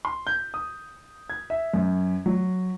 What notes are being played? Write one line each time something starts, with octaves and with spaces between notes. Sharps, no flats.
C6
G6
D#6
G#6
E5
F#2
F#3